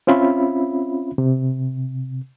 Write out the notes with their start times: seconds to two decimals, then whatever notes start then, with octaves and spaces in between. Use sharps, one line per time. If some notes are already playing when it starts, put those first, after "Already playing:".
0.07 C4 C#4 F4 E5 B5
1.18 C3